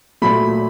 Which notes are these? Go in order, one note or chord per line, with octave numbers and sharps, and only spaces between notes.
A#2 F#3 A3 B5